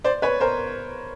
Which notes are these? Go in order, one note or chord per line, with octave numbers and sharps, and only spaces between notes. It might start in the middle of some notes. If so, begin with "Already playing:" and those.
C5 D5
B4 C#5
A#4 C5